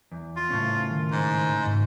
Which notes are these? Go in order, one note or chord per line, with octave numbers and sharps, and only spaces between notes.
E2
F4
A2 C#3 C#4
D#3
G#2
G#2